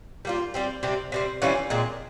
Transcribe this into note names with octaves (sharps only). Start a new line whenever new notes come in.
G3 A#3 F4
G3 C4 G4
C3 G3 C4 G4
C3 G3 C4
E3 G3 C#4 F4
A#2 G#3 C4